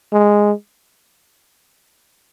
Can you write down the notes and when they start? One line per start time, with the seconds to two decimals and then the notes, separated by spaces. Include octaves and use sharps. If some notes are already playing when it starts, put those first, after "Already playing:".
0.13 G#3